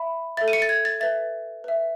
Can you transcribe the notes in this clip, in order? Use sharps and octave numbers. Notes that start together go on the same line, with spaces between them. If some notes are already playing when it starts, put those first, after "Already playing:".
Already playing: E5 B5
A4 E5 A6
D#7
C#7
A6
G#6
A6
B4 E5 A6
B4 E5